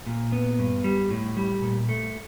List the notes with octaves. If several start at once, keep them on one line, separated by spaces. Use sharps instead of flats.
A#2
B3
G2
G3
A2
G3
A#2
A3